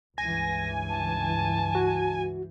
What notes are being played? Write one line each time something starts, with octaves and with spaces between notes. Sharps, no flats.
C#2 G2 E3 G#5 A#6
A5
F#4